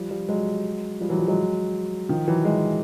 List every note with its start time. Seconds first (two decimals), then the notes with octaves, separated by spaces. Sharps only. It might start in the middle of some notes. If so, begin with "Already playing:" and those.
Already playing: F3 G3
0.10 F3 G3
0.29 F#3 G#3
1.01 F3 G3
1.10 E3 F#3
1.19 F3 G3
1.28 F#3 G#3
2.09 D#3 F3
2.28 E3 F#3
2.45 F#3 G#3